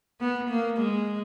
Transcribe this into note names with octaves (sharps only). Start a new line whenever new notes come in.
B3
A#3
G#3